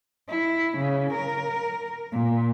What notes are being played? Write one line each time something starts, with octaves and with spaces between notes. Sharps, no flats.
E4
C#3
A#4
A#2